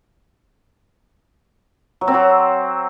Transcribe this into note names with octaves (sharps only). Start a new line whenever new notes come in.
F#3
C4
F#3